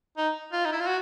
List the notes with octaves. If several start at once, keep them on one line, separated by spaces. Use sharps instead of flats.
D#4
F4
D#4
E4
F4
F#4